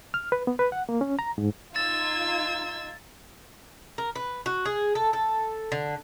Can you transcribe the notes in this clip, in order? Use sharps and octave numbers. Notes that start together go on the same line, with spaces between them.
F6
B4
B3
B4
F#5
A#3
C#4
A#5
G#2
D#4 F4 E6 G#6 A6
A#4
B4
F#4
G#4
A4
A4
D3